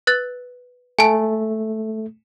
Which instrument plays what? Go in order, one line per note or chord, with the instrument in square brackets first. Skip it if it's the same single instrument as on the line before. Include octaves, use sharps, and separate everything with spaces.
[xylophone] B4 F#6 A6
[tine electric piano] A3 [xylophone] G#5 A5